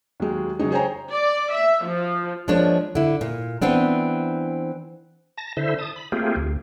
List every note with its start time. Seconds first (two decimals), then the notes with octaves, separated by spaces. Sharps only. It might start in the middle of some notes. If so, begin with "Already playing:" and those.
0.20 D#2 F#3 G#3
0.59 C#3 F#3 G#3 D#4
0.72 G#4 C5 C#5 G5 G#5 A#5
1.13 D5
1.54 E5
1.86 F3
2.48 F3 G#3 A#3 D4 C#5
2.95 D3 E4
3.21 A#2
3.62 E3 B3 C4 D4
5.38 A5 A#6
5.57 D3 E4 C5 E5
5.78 A5 D#6
5.96 B5
6.12 A3 A#3 C4 F4 G4 G#4
6.36 D2